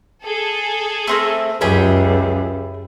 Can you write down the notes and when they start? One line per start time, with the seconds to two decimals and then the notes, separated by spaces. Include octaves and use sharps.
0.24 G#4 A4
1.07 A3 C4 A#4
1.61 C#2 F#2 E4 G4 G#4